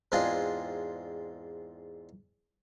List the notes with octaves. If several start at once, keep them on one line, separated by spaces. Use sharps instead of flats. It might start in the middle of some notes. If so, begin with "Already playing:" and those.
E2 G#2 C4 D4 F4 G#4